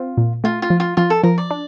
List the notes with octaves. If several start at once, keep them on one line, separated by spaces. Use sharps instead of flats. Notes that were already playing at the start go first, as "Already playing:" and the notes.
Already playing: C4 F4
A#2
A3 F4
F4
F3
F4
F3 F4
A4
F3 A#4
D5
D4